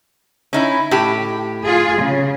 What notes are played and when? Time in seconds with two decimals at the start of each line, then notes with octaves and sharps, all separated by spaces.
0.53 C#4 D#4 E4
0.91 A2 G4
1.65 F4 G#4
2.00 C#3